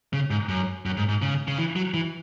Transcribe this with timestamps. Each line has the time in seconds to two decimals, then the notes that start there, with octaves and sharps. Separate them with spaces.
0.13 C#3
0.30 G#2
0.49 F#2
0.86 F#2
0.97 G#2
1.09 G#2
1.22 C#3
1.48 C#3
1.58 E3
1.76 F#3
1.94 E3